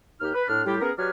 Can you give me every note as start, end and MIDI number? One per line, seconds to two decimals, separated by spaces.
0.20 0.30 39
0.20 0.30 63
0.20 0.30 67
0.20 0.30 89
0.34 0.44 71
0.48 0.63 45
0.48 0.63 62
0.48 0.63 89
0.65 0.78 45
0.65 0.78 55
0.65 0.78 64
0.65 0.78 65
0.65 0.78 67
0.81 0.91 59
0.81 0.91 61
0.81 0.91 68
0.81 0.91 70
0.97 1.10 54
0.97 1.10 67
0.97 1.10 71
0.97 1.10 74
0.97 1.10 80
0.97 1.10 89